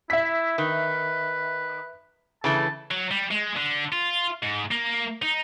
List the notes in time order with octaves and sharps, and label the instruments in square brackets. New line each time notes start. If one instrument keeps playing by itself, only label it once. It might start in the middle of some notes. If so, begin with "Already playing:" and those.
[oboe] E4 [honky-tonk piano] E5 B6
[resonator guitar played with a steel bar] D#3 [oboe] B4
[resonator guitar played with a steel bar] C#3 E3 A3 [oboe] A5
[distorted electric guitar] F#3
G3
G#3
D3
F4
G#2
A#3
D#4